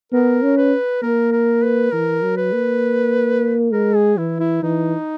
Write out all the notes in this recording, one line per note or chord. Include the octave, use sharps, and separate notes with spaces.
B3 A#4
C#4
B4
A#3 A#4
A#4
B4
E3 A#4
F#3
B4
A#3
G#3 A#4
G#4
E3 E4
E4
E3 D#4